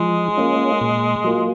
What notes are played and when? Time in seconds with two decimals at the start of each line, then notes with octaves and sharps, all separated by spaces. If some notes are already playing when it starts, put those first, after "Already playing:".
Already playing: F3 G#3
0.37 A#3 C#4 F4
0.81 A#2
1.24 F#3 A#3 F4